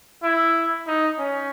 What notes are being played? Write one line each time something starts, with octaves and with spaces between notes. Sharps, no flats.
E4
D#4
C#4